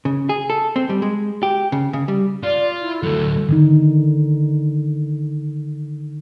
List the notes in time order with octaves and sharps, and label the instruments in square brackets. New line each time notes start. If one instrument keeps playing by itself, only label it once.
[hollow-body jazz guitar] C#3
G#4
A4
C4
G3
G#3
G4
C#3
C#3
G3
[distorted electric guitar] F4 [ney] D5
[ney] E4
[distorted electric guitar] D2 F#3 [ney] A4
[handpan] D3 D#3 D#4